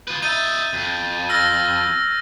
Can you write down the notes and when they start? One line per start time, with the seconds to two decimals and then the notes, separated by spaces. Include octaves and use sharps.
0.08 F4 B4
0.22 D#4 E5 G6 A6 D#7
0.73 F2
1.29 E6 F6 A#6